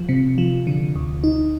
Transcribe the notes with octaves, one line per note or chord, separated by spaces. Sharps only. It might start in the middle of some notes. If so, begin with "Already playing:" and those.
Already playing: F3
C3
F3
D3
D2
D#4